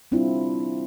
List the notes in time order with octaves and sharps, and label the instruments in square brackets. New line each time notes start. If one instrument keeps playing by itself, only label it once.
[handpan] G3 C4 D4 E4 F4